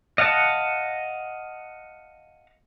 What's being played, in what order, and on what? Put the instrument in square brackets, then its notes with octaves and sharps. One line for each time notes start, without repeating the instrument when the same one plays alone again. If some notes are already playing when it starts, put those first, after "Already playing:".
[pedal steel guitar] D#5 F5 F#5 A5